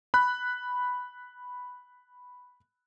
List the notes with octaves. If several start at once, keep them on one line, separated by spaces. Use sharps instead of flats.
B5 F#6